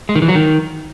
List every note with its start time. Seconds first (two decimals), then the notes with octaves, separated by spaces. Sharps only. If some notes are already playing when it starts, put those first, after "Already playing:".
0.09 G#3
0.16 D#3
0.22 E3
0.28 F#3
0.35 D#3